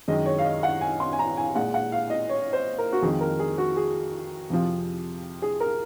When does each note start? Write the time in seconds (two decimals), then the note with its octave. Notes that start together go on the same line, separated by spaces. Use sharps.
0.08 F#2 D#3 G#3 D#5
0.26 C#5
0.38 F5
0.44 D#5
0.63 F#5
0.81 G#5
1.00 C6
1.13 G#5
1.19 A#5
1.37 G#5
1.55 A#2 G#3 F#5
1.74 F#5
1.92 F5
2.10 D#5
2.29 C#5
2.53 C5
2.78 A#4
2.93 F#4
3.02 F2 D#3 G#3 G#4
3.21 A#4
3.39 G#4
3.58 F#4
3.76 G#4
4.50 F2 C3 F3
5.42 G#4
5.60 A#4